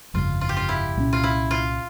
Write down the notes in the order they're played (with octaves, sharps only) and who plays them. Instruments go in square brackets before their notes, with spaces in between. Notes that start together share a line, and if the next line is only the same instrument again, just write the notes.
[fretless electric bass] G1 F2 C#3 G3 [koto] F4
[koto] F4
G4
F4
E4
[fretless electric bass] C2 A#2 G3 C#4
[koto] F4
E4
F4